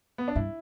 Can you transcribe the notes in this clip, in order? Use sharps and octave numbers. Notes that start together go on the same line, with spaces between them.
B3
D4
G2 E4